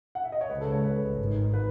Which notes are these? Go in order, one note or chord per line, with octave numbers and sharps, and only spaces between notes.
F#5
E5
D#5
C#5
C#2 C#3 G#3 B4
A4
C#5
B4
G#1 G#2 D#3
B4